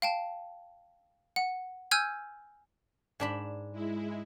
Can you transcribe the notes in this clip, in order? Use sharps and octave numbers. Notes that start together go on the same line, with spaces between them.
F5 G5 A5
F#5
G#5 E6 F6 G6 G#6
G#2 D4 B5
G#3 E4